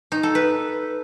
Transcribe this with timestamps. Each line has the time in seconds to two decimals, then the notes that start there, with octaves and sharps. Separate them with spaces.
0.12 D#4
0.23 A4
0.35 B4